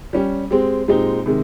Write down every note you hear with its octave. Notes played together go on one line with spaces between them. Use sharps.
G3 C#4 G4
G#3 C4 G4
A#2 G#3 C4 D#4 G4
C3 D#3 G#3